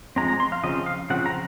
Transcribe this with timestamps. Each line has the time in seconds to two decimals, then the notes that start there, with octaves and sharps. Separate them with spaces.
0.16 F3 G#3 C4 A#5
0.28 A#5
0.40 C6
0.52 F5
0.63 C#3 F3 C4 D#5
0.86 F5
1.10 C#3 F3 C4 F#5
1.26 A#5